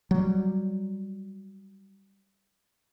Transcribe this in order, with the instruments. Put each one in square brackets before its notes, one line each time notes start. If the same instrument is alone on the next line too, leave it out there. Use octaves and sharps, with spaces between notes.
[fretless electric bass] F#3 G3